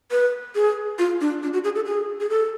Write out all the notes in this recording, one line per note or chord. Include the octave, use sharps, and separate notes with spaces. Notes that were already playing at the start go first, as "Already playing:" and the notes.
B4
G#4
F4
D4
D4
F#4
G#4
A4
G#4
G#4
A4